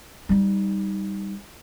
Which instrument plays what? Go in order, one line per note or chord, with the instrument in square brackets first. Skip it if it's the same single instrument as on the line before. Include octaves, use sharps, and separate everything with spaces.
[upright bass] G3 D#4